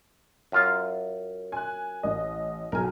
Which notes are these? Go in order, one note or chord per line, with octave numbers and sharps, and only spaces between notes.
F#2 F4 F5
G#5 F#6
A1 D#5
B1 A#4 G#5